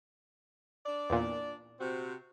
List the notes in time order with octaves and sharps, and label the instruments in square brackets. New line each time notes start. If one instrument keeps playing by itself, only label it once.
[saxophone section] D4 D5
[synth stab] E2 A#2
[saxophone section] C3 C4 F#4